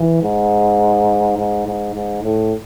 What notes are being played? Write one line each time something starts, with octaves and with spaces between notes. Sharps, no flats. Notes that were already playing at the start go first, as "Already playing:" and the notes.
Already playing: E3
G#2
G#2
G#2
G#2
A2